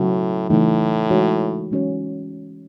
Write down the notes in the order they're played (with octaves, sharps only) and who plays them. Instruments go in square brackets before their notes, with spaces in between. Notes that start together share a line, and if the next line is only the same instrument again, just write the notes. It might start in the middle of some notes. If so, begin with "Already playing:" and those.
Already playing: [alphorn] A2 [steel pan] C#3 F#3 C#4 F#4
[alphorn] A2 [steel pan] C#3 E3 A3 D#4
[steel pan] E3 G#3 D#4 F#4 C#5
E3 G#3 C#4 F#4 C#5